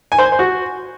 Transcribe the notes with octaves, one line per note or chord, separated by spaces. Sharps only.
G#5
C5
G#5
C5
F#4